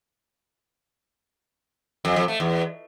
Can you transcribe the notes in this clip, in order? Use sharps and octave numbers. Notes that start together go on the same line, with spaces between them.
F2
F2
A3
E2